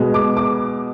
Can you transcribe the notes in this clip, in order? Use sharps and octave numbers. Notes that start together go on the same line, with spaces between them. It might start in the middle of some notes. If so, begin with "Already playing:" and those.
Already playing: B2 G#3
D6
D6